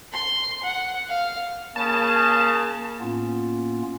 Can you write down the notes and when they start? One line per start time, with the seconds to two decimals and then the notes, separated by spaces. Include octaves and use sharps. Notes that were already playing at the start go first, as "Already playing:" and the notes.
0.13 C6
0.64 F#5
1.09 F5
1.76 C#3 A#3 A5
3.01 A2 A#3 B3 C#4 F4